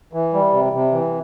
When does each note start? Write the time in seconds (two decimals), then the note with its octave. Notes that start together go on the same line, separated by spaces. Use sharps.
0.13 E3
0.34 G3
0.53 C3
0.73 C3
0.92 E3